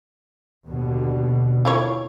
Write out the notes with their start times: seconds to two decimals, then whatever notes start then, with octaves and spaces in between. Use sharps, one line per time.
0.66 D#2 B2 D3
1.65 E4 F4 C#5